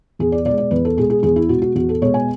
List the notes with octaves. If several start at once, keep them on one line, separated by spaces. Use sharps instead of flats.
E2 G#4
D5
B2 D5
G#3
D5
E2 B4
A4
B2 G#3 G#4
G#4
E2 G#4
E4
B2 G#3 F#4
F#4
E2 F#4
A4
B2 G#3 C#5
G#5